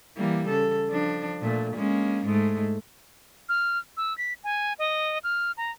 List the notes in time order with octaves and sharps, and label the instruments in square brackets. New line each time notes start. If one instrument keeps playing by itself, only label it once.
[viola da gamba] E3 G3 A#3
C#3 A4
F3 D4
A#2 A3
G#3 A#3 C#4
G#2 G#3 A3
[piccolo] F6
E6
B6
G#5
D#5
F6
A#5